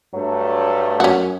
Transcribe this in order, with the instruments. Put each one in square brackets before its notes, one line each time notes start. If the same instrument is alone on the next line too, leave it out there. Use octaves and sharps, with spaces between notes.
[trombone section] G2 A3 [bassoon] F#3
[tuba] F#2 [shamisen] C#4 F#4